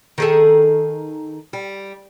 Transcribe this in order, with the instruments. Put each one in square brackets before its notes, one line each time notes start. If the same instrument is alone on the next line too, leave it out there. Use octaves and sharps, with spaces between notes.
[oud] D#3 G#4 A4
G3